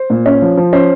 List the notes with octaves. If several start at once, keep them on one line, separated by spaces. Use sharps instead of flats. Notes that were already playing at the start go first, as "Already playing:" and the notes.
Already playing: C5
A#2
C#4
F3
F3
C#4 C5